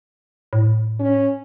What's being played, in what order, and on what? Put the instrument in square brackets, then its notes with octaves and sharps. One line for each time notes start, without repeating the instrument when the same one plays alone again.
[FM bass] A2
[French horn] C#4